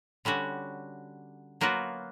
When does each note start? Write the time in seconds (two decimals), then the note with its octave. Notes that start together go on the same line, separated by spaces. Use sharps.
0.25 D3 G3 C#4 F#4
1.61 F#3 A#3 B3 F4 F#4